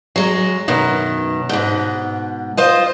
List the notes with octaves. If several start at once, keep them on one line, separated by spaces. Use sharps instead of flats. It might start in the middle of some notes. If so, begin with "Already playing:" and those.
F#3 G#3
F#2 B2 D#3
G#2 B2
F4 C5 D#5